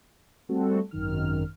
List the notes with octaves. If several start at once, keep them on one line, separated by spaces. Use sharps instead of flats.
G3 A3 C4 F#4 A4
G#1 F#2 D#3 F6